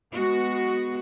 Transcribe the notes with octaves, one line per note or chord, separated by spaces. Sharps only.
G#3 B3 F#4